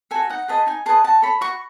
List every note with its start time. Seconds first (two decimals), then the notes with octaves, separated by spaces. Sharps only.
0.11 F#4 A4 G#5
0.30 D#4 F#5
0.48 G#4 B4 D#5 A5
0.66 D#4 G#5
0.86 G#4 B4 D#5 A5
1.04 F#4 A5
1.22 A4 C#5 B5
1.41 F#4 C#6